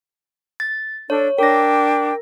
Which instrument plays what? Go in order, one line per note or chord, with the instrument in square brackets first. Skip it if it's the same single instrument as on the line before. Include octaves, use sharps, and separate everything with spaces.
[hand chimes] A6
[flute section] D4 A4 [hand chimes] C#5
[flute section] D4 G5 D6 [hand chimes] A#4 A#6